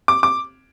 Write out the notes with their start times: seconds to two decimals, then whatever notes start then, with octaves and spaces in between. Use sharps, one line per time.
0.08 D6
0.23 D6